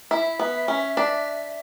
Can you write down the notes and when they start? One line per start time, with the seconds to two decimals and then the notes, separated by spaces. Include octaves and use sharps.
0.11 E4 E5
0.39 B3
0.68 C#4
0.97 D4